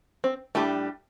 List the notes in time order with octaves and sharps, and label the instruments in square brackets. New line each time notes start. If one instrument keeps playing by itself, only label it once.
[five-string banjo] C4
[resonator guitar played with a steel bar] A2 G3 D4 G4 [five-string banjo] A3